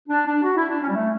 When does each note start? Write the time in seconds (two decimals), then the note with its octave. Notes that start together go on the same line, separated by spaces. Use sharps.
0.08 D4
0.26 D4
0.42 F#4
0.56 E4
0.68 D4
0.81 C#4
0.88 G3
0.94 A3